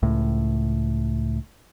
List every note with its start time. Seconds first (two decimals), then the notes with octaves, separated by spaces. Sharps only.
0.02 C#2 A2